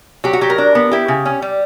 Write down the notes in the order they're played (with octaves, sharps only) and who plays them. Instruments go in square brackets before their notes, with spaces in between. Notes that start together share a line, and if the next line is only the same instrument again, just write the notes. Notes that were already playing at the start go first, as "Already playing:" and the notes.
[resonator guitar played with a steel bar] F#3 G4
F#4
F#3 G4
A#4
D4
B3
E4 G4
C#3
C#4
G3